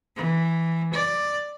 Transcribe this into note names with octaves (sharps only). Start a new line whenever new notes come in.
E3
D5